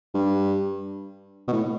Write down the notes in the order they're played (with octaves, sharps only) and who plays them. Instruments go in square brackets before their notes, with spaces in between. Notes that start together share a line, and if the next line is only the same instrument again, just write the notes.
[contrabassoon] G2
B2
A2